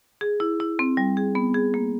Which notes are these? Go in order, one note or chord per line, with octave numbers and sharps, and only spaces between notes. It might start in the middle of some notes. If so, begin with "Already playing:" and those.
G#4
E4
E4
C4
G3
G#4
B3
G#4
A#3